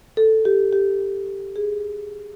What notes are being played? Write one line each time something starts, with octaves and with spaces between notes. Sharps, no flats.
A4
G4
G4
G#4